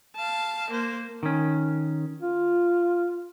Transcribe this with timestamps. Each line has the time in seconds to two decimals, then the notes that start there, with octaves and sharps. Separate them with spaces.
0.16 F5 A5
0.70 A#3 C5
1.23 D#3 C#4
2.21 F4